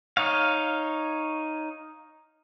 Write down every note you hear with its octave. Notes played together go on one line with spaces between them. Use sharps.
D#4 C#5 F5